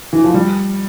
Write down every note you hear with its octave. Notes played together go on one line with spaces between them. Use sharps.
E3
F3
G3